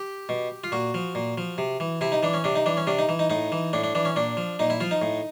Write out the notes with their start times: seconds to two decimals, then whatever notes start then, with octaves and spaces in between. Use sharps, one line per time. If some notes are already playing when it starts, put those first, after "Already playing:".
Already playing: G4
0.29 B2
0.64 F4
0.72 A#2 F#4
0.94 F3
1.15 A#2
1.38 F3
1.58 C3
1.80 E3
2.01 C3 E4
2.12 D#4
2.23 E3 D4
2.34 C#4
2.44 C3 D4
2.56 D#4
2.66 E3 D4
2.77 C#4
2.87 C3 D4
2.99 D#4
3.09 E3
3.19 D#4
3.30 A2 D#4
3.52 E3
3.73 A2 D4
3.84 D4
3.95 E3 D4
4.05 C#4
4.16 A#2 D4
4.37 F3
4.59 A#2 D#4
4.70 E4
4.80 F3 F4
4.91 D#4
5.02 A2